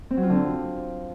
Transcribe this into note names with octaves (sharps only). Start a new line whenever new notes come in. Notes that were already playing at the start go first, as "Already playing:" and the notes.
C4
F#3
F4
D3
C4